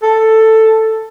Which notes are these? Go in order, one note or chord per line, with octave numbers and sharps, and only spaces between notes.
A4